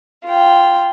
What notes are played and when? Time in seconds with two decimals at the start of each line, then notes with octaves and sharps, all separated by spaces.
0.25 F4 G5